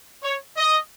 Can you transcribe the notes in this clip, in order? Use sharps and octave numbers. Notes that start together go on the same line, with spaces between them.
C#5
D#5